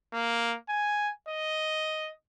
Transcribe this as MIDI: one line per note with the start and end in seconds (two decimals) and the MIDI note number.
0.13 0.55 58
0.69 1.10 80
1.28 2.10 75